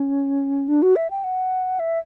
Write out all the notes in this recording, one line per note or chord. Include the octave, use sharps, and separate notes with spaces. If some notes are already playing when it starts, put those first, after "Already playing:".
Already playing: C#4
D4
F#4
E5
G5
F#5
E5